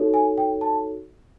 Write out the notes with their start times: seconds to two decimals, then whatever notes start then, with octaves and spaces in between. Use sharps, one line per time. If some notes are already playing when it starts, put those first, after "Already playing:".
Already playing: D#4 F#4 A4 C#5
0.14 G#5
0.38 G5
0.61 A5